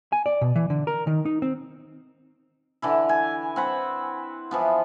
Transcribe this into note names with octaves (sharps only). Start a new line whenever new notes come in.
G#5
D5
B2
E3
D3
A#4
D#3
D#4
C4
D3 E3 E4
G#5
C4 F#5 B5
E3 F3 B3